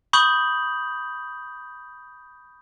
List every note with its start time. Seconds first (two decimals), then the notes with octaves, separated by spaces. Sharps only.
0.13 B5 C#6 D#6 G6 F#7